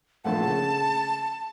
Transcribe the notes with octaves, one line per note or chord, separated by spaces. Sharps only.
A#1 A3 F#5 A5
C#3